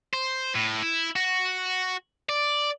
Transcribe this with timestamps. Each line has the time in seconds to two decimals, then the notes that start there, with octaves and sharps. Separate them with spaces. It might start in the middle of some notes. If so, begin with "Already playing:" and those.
0.13 C5
0.55 A2
0.82 E4
1.16 F#4
2.29 D5